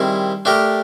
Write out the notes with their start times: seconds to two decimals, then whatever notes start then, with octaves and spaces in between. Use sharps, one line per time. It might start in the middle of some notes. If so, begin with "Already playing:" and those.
Already playing: D#3 G3 C4 E4 G#4
0.45 A3 D4 G4 A#4